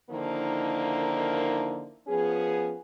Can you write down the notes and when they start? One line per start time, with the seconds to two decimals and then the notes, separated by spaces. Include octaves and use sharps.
0.10 D3 D#3 F3 A#3 D#4 E4
2.07 F3 B3 C#4 G#4